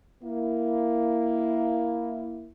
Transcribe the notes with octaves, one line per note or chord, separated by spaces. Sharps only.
A#3 E4